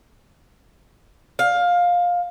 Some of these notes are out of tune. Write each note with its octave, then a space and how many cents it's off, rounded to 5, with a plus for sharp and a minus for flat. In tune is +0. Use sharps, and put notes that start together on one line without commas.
F5 +15